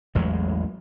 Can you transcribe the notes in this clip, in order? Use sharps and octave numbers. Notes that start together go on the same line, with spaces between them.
A1 E2 F#3 G#3